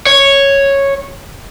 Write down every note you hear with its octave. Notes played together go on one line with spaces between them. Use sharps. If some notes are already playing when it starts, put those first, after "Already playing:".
C#5